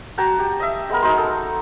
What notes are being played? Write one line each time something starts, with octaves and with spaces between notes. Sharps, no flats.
F#4 G5 A5 A#5
G4
D#5 E5
G#3 B3 A#4
G#3 D#4 F#4 C6
A4